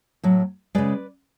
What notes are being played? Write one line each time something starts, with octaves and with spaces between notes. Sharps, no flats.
A2 F#3
C#3 G#3 B4 D5